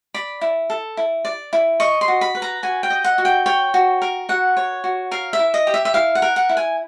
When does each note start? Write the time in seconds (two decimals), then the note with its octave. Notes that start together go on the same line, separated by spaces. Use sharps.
0.14 D5 B5
0.41 E4
0.70 A4
0.97 E4
1.25 D5
1.53 E4
1.80 D#5 C#6
2.01 C6
2.08 F#4
2.21 B5
2.35 B4
2.42 A#5
2.63 F#4 G#5
2.83 G5
2.90 D#5
3.04 F#5
3.18 F#4
3.25 G5
3.46 C#5 G5
3.74 F#4
4.02 A#4
4.29 F#4 F#5
4.57 C#5
4.84 F#4
5.11 A#4 F5
5.33 E5
5.39 E4
5.54 D#5
5.67 G4
5.74 E5
5.85 E5
5.94 E4 F5
6.15 F#5
6.22 A#4
6.36 F#5
6.49 E4
6.57 G#5